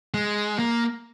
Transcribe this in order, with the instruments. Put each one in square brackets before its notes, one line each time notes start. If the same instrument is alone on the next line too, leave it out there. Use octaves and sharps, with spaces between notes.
[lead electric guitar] G#3
A#3